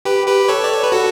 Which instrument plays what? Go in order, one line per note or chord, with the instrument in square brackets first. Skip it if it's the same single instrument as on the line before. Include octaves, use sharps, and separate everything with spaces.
[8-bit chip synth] G4 B4
G4 B4
A4 C#5
D5
C#5
B4
F#4 A4